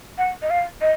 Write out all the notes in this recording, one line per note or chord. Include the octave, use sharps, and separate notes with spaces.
F#5
D#5
F5
D#5